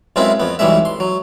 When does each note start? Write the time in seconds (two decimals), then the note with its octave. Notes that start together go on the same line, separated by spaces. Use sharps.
0.16 F#2 G#3 B3 C4 E4 F4
0.40 F2 B3
0.59 B1 E3 G3 G#3 E5
0.85 C6
1.00 F#3